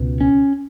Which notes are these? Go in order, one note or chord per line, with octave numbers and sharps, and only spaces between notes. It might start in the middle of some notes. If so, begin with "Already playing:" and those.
Already playing: C#2 B2
C#4